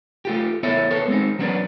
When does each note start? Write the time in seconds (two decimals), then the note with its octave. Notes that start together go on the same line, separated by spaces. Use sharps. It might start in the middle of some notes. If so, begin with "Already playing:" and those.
0.25 A3 F4 G4
0.63 B3 E4 A4 C#5 E5
0.91 B3 A4 C#5
1.08 G#3 C4 D#4
1.39 F#3 G3 B3 C#4 D4